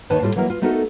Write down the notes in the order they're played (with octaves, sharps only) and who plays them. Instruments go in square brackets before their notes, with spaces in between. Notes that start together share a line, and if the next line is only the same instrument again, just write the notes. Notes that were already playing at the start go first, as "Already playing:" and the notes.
[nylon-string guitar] D#2 D#3 B4 C#5 A5
A2 G3 F4 A4
E3 F#3 A#3 E4 A#4
F4
A3 B3 D#4 F#4 A4 A#4